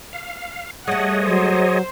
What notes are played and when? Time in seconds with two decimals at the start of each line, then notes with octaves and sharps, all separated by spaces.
0.13 F5
0.87 G3 A3 G#4 C#5 D#5 F#5
1.27 F#3 C5